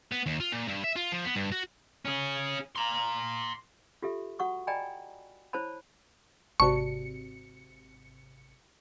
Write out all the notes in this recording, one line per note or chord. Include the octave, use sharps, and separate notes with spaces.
B3
D#2
F4
A#2
G2
E5
F4
F3
B3
G2
F#4
C#4 G#4
A#5 C6
F4 G4 A4 E5
F#4 F#5 C#6 D#6
D5 D#5 G5 G#5 A#5 B5
E4 C5 C#5 A5 B5
G#1 C3 F#4 D5 A5 C#6 C#7